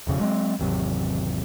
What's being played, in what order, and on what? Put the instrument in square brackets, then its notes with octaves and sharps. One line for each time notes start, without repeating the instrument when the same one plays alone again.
[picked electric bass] E1 F2 C#3
F#3 G#3 A#3 C4
G#1 E2 C3 F#3